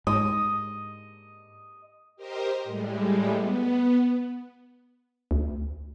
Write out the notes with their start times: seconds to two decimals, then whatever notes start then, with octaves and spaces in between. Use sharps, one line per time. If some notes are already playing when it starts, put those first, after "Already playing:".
0.07 G#2 D#5
2.16 G4 A#4 C5 D#5
2.64 A2 G3 G#3
3.32 B3
5.31 D2